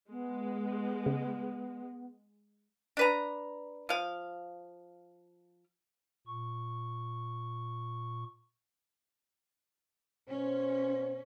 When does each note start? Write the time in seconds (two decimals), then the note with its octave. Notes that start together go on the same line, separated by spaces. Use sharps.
0.11 G#3 B3
1.06 C#3
2.97 D4 B4 A#5
3.89 F3 F5
6.27 A#2 C#6
10.28 B2 C#4 C5